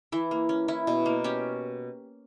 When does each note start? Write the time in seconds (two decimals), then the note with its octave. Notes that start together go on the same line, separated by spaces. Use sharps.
0.12 E3 E4
0.31 A#3
0.49 C#4
0.68 C#4 E4
0.87 B2
1.06 A#3
1.24 C#4 G4